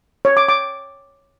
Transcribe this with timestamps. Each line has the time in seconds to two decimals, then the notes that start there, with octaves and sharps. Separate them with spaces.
0.25 C#5
0.37 D6
0.49 D6